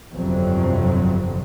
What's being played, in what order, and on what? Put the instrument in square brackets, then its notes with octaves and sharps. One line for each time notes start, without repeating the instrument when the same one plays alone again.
[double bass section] G1 F2 C3 F#3 C4